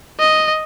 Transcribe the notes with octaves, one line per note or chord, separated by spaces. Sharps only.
D#5